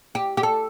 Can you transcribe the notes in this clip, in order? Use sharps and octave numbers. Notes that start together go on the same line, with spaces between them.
G4
G4
A4